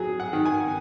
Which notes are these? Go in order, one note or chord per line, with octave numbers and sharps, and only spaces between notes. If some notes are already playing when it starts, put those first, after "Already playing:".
Already playing: F#3 G#4
F#5
D#3
G#5